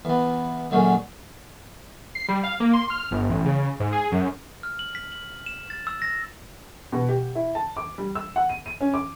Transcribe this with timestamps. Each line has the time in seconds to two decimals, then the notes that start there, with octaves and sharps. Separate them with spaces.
0.05 E2 B3
0.71 F#2 A#2 D3 F#3 G#3
2.15 C7
2.28 G3
2.43 F5
2.60 A#3
2.73 C6
2.90 F6
3.11 G1
3.29 A1
3.45 C#3
3.80 G#2
3.92 G#4
4.12 F#2
4.63 F6
4.79 F#7
4.95 B6
5.12 F#7
5.46 E7
5.70 A6
5.87 E6
6.02 A#6
6.92 B2
7.09 G4
7.35 E4
7.55 A5
7.77 D6
7.98 G3
8.15 E6
8.36 F#5
8.49 D#7
8.66 D#7
8.81 C#4
8.94 D6